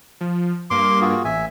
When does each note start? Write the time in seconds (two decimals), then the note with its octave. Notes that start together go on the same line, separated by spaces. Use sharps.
0.21 F3
0.70 G2 A#3 C6 D6
1.01 F4 F#4 G#4
1.25 A1 E5 G#5